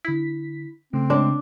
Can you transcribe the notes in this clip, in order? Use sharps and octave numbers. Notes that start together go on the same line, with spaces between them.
D3 E4 B6
C#3 A3 C4
G#3 D4